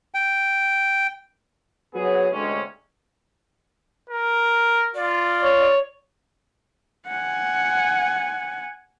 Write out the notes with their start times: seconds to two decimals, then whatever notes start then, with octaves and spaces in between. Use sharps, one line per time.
0.14 G5
1.94 F#3 B3 G#4
2.32 D2 C3 G#3 C#4
4.09 A#4
4.95 F4 D5
5.43 C#5
7.08 F#5 G#5